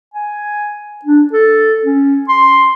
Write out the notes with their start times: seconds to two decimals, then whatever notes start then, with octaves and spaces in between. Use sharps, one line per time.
0.14 G#5
1.05 D4
1.33 A4
1.85 C#4
2.29 C6